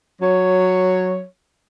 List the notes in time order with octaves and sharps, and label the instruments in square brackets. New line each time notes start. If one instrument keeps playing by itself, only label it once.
[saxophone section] F#3 C#5